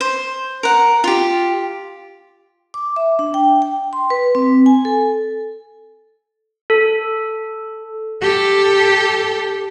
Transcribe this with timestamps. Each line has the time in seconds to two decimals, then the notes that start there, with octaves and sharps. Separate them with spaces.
0.01 C5
0.63 A#4 F#5
1.04 F4 G4
2.74 D6
2.96 E5
3.19 D4
3.34 G5
3.62 G5
3.93 C6
4.10 B4
4.35 C4
4.66 G#5
4.85 A4
6.70 A4
8.21 G4 A4